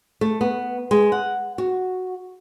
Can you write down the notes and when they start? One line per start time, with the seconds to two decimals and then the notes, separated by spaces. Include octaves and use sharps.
0.21 A3
0.41 B3
0.91 G#3
1.12 F#5
1.58 F#4